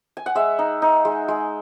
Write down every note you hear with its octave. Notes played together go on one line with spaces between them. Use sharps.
G#5
F#5
G#3 E5
D#4
D#4
G#3
G#3